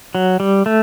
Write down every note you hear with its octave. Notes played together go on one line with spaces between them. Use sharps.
F#3
G3
A3